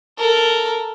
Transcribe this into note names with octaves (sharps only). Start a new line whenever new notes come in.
A4 A#4